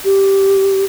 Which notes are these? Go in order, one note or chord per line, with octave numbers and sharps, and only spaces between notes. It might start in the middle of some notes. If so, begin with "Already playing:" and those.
G4